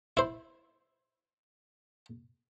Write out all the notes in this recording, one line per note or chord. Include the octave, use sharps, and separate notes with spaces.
E4 C5